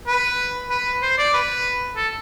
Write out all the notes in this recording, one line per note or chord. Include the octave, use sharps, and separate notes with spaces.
B4
B4
C5
D5
B4
A4